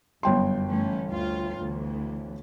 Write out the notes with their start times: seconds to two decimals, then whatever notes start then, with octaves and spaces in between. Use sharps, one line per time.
0.23 G1 F#2 F#3 G5 C6
0.70 E3 A3 C#4
1.09 D2 F4
1.59 D2 E3